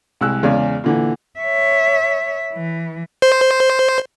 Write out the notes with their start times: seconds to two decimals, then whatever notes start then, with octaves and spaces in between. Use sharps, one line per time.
0.21 C2 G#3 E6 F#6
0.43 E2 C#3 G#3 G#4 D5 G#5
0.84 A#2 D3 E3
1.40 C#5 E5
2.53 E3
3.22 C5